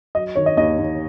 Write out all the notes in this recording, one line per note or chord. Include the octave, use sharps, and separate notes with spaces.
F#3 D#5
D#3 C#5
D#5
D#2 D#5
D#2